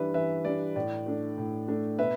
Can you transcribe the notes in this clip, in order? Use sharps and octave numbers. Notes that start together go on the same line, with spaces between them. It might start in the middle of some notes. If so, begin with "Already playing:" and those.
Already playing: E3 G3 D4 B4 E5
E3 B4 E5
G3 D4 D5
A2 D5
A3 D4
A2
A3 D4
B2 B4 E5